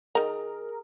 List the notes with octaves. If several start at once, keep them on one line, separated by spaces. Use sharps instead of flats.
D#3 G#4 A#4 A#5